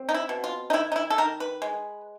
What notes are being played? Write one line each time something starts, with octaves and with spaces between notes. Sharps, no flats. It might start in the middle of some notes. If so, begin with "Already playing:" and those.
Already playing: C4
D#4
E4
B2
F4
D#4
D#3 E4
D#4
E4
A4
D#3 A#4
B4
G#3